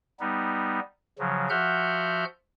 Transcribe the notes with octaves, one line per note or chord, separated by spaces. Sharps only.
G3 B3 D#4
C#3 F3 F#3
F3 F#4 E5 F#5 F6 G6